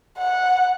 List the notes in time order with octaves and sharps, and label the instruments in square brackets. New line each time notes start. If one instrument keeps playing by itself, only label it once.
[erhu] F#5